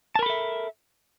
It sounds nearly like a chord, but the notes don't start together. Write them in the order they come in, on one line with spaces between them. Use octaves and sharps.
A5 A#4 B5 A4 E5